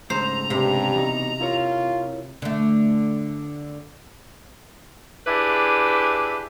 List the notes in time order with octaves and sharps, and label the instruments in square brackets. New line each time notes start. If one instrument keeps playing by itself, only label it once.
[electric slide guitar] G#2 C#3 A3 [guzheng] C5 [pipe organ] A#5
[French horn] G2 [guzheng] C3
[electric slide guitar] E2 B2 D#4
[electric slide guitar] E4 A#4 C#5 [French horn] F4
[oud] D3 A3
[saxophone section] D4 E4 G4 G#4 B4